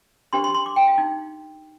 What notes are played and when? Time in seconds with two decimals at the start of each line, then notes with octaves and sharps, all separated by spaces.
0.33 D4 G4 C5 C6
0.44 C6
0.54 C6
0.66 D6
0.76 G5
0.87 F5
0.98 D#4